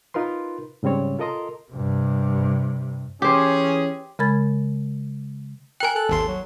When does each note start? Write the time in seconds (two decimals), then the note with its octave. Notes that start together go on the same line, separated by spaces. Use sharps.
0.14 D#4 F4 A#4 B4 C6
0.83 G#2 C#3 G3 C4 C#5
1.19 F4 A4 A#4 D#5 A#5 C6
1.72 G2 C3
3.22 E3 C#4 G4 G#4 C5
4.19 C#3 G#3 A#4 B5 G#6 A6
5.80 A#4 G5 G#5 F#6
5.95 A4 F#6
6.09 G#1 D#2 C6
6.28 F#3